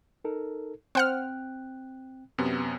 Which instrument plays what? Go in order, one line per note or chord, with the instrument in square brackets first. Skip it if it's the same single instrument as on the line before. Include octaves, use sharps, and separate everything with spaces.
[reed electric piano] D#4 A4 A#4
[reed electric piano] C4 G5 F#6 [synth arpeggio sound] C5 F#5 F6
[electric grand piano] F#2 C3 B3